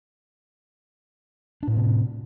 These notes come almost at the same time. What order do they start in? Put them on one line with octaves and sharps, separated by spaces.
D4 A2 C4 C3